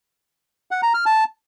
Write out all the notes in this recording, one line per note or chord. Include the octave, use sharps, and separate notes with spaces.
F#5
A#5
F6
A5